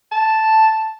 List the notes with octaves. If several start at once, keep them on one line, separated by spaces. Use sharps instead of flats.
A5